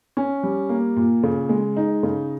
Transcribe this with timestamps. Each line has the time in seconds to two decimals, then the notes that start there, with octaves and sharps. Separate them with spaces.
0.17 C#4
0.43 G3
0.69 A#3
0.96 A#2
1.23 C#3
1.49 G#3
1.77 D#4
2.03 C#3